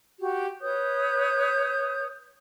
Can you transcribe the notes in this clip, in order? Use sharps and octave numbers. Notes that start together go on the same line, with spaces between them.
F#4 G4
B4 C#5 D#6 G6